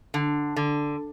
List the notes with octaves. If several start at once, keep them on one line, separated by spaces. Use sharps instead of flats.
D3
D3